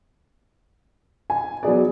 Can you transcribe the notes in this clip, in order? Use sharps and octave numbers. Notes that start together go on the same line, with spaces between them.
G#5
F#3 B3 G#4 D5